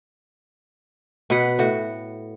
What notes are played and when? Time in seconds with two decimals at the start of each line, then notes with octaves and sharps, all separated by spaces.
1.30 B2 B4 F#5
1.59 A2 F#4